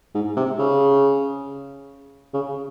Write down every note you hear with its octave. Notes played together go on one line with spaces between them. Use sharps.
G#2
C3
C#3
C#3